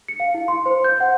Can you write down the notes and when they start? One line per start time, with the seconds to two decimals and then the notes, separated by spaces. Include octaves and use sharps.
0.08 C#7
0.20 F5
0.34 E4
0.48 C6
0.66 C5
0.84 G6
1.00 F#5